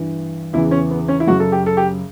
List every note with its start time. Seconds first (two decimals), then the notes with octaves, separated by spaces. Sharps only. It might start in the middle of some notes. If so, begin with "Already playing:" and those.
Already playing: G2 E3
0.53 E2 C#3 E3 E4
0.71 C#4
0.91 B3
1.08 C#4
1.20 E4
1.27 F#2 C#3 F#3 F#4
1.40 A4
1.52 G4
1.66 A4
1.77 G4